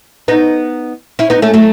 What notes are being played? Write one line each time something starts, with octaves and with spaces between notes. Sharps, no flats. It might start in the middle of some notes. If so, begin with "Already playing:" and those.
B3 D#4
C#4 E4
B3 D#4
A3 C#4
F#3 A3